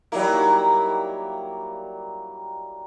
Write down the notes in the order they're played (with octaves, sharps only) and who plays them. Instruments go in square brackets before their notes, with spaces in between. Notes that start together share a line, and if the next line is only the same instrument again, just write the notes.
[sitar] F#3 D#4 E4 [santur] G3 A#3